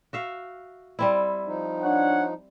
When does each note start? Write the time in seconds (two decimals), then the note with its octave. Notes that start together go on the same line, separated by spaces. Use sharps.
0.13 F#4 E5 F5
0.99 G3 C4 E4
1.46 F3 D#4
1.82 D4 C#5 F#5